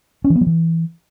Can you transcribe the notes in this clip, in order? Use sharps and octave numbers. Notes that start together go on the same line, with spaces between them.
C#4
E3
B3
F#3
E3